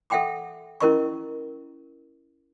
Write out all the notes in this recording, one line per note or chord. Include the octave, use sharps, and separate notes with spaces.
A4 E5 F#5 G5 C6 D6
C#4 E4 A#4 D#5 C6 C#6